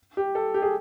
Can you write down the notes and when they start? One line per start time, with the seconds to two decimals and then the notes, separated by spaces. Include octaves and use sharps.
0.17 G4
0.35 A4
0.54 G4
0.62 G#4